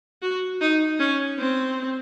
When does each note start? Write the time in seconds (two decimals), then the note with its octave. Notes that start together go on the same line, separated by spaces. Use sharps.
0.22 F#4
0.61 D#4
0.99 C#4
1.38 C4